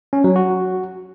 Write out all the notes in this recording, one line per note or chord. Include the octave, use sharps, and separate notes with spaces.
C#4
F#3
F#4